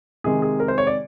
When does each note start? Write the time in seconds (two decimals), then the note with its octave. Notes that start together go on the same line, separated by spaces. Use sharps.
0.24 C3 D#3 G#3 G#4
0.42 G#4
0.60 A#4
0.68 C5
0.78 C#5
0.87 D5